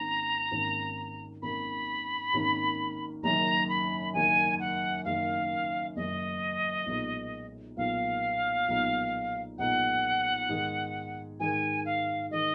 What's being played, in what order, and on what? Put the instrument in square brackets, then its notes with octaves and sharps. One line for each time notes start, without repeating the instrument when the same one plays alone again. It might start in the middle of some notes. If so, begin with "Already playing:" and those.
Already playing: [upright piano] G#1 G#2 D#3 A#3 C#4 [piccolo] A#5
[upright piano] G#1 G#2 D#3 A#3 C#4
[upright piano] G#1 G#2 D#3 A#3 C#4 [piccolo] B5
[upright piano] G#1 G#2 D#3 A#3 C#4
[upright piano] F#1 F#2 D#3 [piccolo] A#5
[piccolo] B5
[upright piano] F#1 F#2 D#3 [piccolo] G#5
[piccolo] F#5
[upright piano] F#1 F#2 D#3 [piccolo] F5
[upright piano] F#1 F#2 D#3 [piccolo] D#5
[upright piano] B1 A#2 G#3 D#4
[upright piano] B1 A#2 G#3 D#4 [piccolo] F5
[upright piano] B1 A#2 G#3 D#4
[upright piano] B1 A#2 G#3 D#4 [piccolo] F#5
[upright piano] G#2 D#3 G#3
[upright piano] G#2 D#3 G#3 [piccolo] G#5
[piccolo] F5
[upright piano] D#3 G#3 [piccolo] D#5